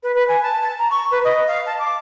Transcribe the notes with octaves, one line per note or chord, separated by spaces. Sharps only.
B4
B4
G#5
A5
A5
A#5
C#6
B4
D#5
F5
A5
D6